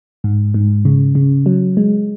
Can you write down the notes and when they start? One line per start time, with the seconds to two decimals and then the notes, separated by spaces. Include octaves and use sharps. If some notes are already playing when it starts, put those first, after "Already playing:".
0.24 G#2
0.54 G#2
0.85 C#3
1.15 C#3
1.46 F#3
1.77 G#3